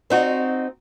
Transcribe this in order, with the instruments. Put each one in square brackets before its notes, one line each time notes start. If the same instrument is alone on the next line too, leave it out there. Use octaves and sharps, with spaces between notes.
[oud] C4 D#4 F#4